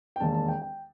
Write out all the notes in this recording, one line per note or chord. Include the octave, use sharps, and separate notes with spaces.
G5
E1 D#2 D#3 A5
A5
G5
G5